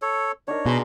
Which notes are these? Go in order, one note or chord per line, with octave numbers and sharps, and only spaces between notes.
A4 C#5
D4 D#4 A#4 C#5
B2 G#4 A#5 C6